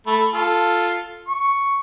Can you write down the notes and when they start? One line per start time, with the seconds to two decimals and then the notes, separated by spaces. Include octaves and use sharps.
0.07 A3 B5
0.34 F4 A4
1.28 C#6